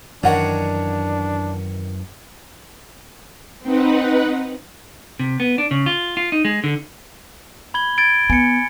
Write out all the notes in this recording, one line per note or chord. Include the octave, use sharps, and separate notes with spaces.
F#2 D#3 E3 F#3 D4 C#5 D5 F#5
C4 D#4 B4 F#5
C3
B3
D4
C#3
F4
F4
D#4
G#3
D3
B5 G#6 G7
G#6 A6 D7
B3 G#5 C#7